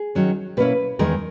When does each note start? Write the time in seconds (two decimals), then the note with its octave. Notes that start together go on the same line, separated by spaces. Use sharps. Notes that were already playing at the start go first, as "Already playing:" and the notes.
Already playing: G#4
0.15 D#3 F#3 C#4
0.57 B2 A#3 C#4 E4 B4
0.99 E2 D#3 G#3 A#4